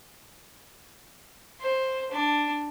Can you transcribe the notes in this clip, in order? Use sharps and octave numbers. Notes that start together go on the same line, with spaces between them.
C5
D4